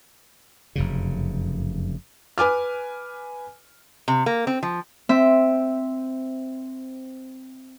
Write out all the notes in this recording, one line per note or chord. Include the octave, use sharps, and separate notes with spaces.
F1 F#2 C#3
B4 G#5 D6 F6
C3
A#3
C4
F3
C4 E5